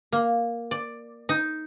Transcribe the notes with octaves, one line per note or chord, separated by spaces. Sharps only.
A#3
D5
D#4